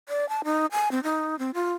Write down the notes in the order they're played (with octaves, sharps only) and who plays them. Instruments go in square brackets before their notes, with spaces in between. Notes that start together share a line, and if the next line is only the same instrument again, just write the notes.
[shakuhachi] D5
A5
D#4
G#5
C4
D#4
C4
F4